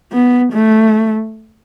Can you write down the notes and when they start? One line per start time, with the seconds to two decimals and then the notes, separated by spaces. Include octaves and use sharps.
0.12 B3
0.53 A3